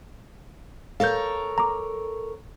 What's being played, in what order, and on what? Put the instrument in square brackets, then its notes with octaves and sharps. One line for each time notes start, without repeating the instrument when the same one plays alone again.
[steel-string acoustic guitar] A4 A#4 C#5 [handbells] F5 G6
[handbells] A#5 D6